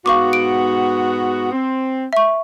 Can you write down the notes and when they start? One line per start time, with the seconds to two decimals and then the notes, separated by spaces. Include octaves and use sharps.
0.06 G#2 B3 F#4 F5 C#6 D6
0.33 D7
1.52 C4
2.13 E5 C#6